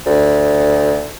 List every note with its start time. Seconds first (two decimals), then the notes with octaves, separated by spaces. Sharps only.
0.06 D2